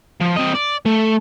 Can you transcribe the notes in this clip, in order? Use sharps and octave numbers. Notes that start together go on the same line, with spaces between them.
F3
C4 D#5
D5
A3